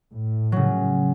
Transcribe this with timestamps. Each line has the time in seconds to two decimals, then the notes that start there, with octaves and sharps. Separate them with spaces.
0.13 A2
0.52 C#3 F#3